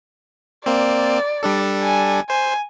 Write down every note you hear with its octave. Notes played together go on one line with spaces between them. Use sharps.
A#3 C4 D5
G3 D4 A4
G#5
C5 G#5